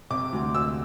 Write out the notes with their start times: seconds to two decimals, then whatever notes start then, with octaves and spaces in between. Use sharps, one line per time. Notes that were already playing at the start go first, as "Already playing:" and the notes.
0.10 C3 D6
0.33 D2
0.55 D2 E6